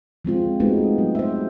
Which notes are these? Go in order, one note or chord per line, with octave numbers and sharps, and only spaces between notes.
F3 G#3 C4 F4
G#3 A3 B3 C4 D#4 F#4
F#3
C5 E5